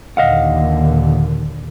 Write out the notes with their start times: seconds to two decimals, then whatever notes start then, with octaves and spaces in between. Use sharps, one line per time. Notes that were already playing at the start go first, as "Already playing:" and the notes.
0.17 D#2 A#2 D3 D#5 F5 F#5